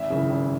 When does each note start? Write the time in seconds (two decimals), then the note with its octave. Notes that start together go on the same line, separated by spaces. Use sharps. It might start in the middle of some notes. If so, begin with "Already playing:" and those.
Already playing: G#1 E5
0.10 F#2 C#3 E3
0.30 G#1